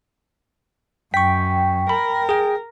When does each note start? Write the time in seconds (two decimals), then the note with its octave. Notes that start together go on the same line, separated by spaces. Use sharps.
1.14 F#2 G5 C#6 B6
1.89 A#4 B5
2.29 G#4 G5